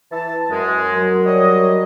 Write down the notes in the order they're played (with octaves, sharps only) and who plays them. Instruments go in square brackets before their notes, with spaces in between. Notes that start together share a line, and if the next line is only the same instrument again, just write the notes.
[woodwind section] E3 A5
F#2 G#3
[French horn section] F#3 A#4
[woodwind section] G3 C#5 D#5